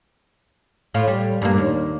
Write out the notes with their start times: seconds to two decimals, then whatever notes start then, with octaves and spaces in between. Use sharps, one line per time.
0.94 A2 F4
1.08 G3
1.42 G2 A#3
1.58 D#2